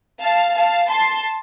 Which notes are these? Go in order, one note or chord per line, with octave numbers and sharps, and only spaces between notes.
F5 A5
F5 A5
A5 C6